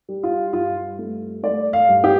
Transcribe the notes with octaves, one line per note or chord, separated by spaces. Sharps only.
G3
F4
G2 F4
A3
A3 D5
F5
G2
G4